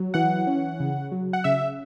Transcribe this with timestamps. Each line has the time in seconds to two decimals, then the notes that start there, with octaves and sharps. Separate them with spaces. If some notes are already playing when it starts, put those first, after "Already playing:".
Already playing: F#3
0.14 E3 F#5
0.47 C#4
0.80 C#3
1.12 F#3
1.33 F#5
1.44 C#3 E5